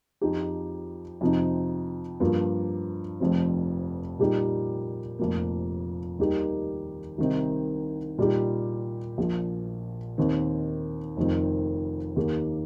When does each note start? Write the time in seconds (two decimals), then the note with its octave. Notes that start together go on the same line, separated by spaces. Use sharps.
0.21 F2 F3 D#4 G4
1.21 F2 C3 F3 C4 D#4
2.20 G2 F3 A#3 F4
3.20 F1 F2 F3 C4
4.19 A#2 G3 D#4 G4
5.19 F1 F2 F3 A#3
6.19 D#2 D#3 G3 D#4 G4
7.18 C2 C3 D#3 C4 D#4
8.18 A#2 G3 D#4 G4
9.18 A#1 A#2 F3
10.18 D#2 D#3 C4
11.17 F1 F2 D#3 C4
12.16 D#2 D#3 A#3 G4